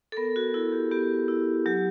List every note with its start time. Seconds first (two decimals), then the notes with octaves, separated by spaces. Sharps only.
0.12 A4
0.17 B3 A#4
0.36 F#4
0.54 E4 F#4
0.72 G4
0.91 B3 G4
1.28 E4
1.66 F#3 G4